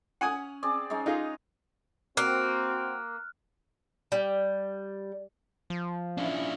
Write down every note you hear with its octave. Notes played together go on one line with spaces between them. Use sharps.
C#4 F#5 G#5 D#6
C4 G#4 D5
G#3 C#4 D#4
D#4 F4 G#4 A#5
A#3 C4 F#4 F6 F#6
G3
F3
C#4 D4 E4 F4